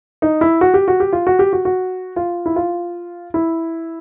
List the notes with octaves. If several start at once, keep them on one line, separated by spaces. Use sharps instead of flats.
D#4
E4
F#4
G4
F#4
G4
F4
F#4
G4
F#4
F#4
F4
E4
F4
E4